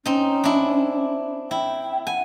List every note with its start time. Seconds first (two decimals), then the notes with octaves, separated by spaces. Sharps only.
0.06 C4 C#4 D#4
0.44 D4 E4
1.51 E4 G5
2.07 F#5 G#5